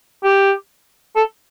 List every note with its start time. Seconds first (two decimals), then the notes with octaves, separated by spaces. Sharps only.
0.24 G4
1.16 A4